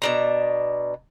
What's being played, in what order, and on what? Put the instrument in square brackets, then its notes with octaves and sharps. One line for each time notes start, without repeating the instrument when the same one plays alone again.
[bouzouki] B2 D4 A#5